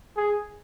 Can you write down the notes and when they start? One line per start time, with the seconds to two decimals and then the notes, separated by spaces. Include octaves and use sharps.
0.17 G#4